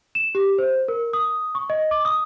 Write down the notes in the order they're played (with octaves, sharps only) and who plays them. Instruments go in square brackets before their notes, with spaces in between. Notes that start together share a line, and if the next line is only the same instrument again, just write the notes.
[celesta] E7
G4
C5
A#4
D#6
C#6
D#5
D6
D#6